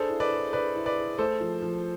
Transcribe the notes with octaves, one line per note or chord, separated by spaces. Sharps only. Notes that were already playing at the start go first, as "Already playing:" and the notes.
Already playing: D4 G#4 A4 C5
E4
B4 D5
G#4
G#4 B4 D5
E4
B4 D5
G#4
A3 A4 C5
F3
F3